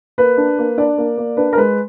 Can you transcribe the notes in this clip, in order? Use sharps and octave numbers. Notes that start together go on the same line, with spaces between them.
A#3 B4
D4
A#3
D4 D5
A#3
A#3
D4 B4
A#4
G#3 B4